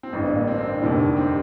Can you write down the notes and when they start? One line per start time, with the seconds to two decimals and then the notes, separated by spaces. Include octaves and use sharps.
0.03 C4
0.13 A1 G2 D3 D4
0.30 A#3
0.47 C4
0.58 C4
0.65 D4
0.81 F1 D#2 D3 G3 D#4
0.99 D#4
1.17 C4